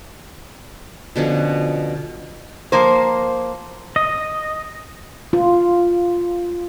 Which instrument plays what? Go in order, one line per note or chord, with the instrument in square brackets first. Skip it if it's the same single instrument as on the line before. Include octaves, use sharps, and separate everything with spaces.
[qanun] B2 D3 F3 C#4
[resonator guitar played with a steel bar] F3 A#3 C5
[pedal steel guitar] D#5
[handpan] F4